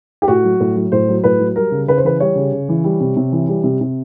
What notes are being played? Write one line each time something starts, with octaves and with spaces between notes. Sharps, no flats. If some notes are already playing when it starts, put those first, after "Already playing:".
G4
A2 F#4
F#3
A2
F#3
A2 C5
F#3
A2 B4
F#3
G3 A#4
C#3
C#3 B4
C5
E3 B4
G3 C#5
C#3
C#3
E3
G3
C3
C3
E3
G3
C3
C3